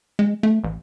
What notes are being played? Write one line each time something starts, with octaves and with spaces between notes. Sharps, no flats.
G#3
A3
A1